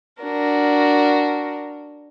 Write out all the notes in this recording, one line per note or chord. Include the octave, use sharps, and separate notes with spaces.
D4 F#4 A#4